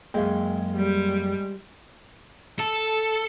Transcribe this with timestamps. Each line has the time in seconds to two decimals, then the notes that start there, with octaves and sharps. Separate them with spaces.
0.14 F#2 G#3 A#3 G#4 F5 G5
0.76 G3
2.60 A4